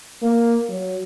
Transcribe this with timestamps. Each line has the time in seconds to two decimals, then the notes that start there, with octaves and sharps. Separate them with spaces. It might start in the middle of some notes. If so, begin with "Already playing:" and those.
0.22 A#3
0.69 F#3